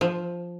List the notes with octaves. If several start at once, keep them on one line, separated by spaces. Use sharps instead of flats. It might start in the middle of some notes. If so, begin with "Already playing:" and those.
F3